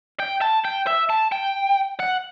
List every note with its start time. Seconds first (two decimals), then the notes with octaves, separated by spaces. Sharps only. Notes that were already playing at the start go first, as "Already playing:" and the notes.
0.20 G5
0.41 A5
0.65 G5
0.87 E5
1.10 A5
1.32 G5
2.00 F#5